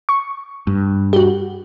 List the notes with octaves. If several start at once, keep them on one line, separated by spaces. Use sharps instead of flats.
C#6
G2
F#4 G4